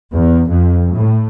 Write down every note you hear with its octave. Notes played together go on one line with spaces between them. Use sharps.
E2
F2
A2